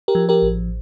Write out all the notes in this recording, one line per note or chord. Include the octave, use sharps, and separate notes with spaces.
G4 A#4
F3
G4 A#4
A1